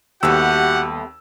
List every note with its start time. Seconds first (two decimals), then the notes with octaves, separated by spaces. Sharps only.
0.23 D#2 G3 A3 B3 F#4 G4 F#5 E6